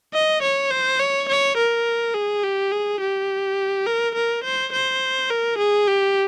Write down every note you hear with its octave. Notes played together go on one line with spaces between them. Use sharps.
D#5
C#5
C5
C#5
C#5
A#4
G#4
G4
G#4
G4
A#4
A#4
C5
C5
A#4
G#4
G4